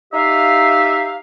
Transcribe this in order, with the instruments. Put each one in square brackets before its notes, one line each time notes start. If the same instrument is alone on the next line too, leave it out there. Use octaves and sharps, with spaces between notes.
[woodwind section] D#4 G4 E5 F5